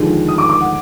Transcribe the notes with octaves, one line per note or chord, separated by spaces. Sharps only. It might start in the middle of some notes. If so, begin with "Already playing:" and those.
Already playing: D#2 D3 F3 G#3
D#6
D6
D6
F#5